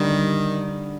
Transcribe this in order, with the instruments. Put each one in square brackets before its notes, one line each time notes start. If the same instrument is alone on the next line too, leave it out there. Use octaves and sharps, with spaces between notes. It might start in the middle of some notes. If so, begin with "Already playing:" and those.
Already playing: [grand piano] D3 G3 D4 [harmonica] D#3